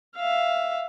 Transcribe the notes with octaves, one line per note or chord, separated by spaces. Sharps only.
E5 F5